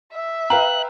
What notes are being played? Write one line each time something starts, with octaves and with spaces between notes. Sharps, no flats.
E5
B4 F5 G5 A#5 F#6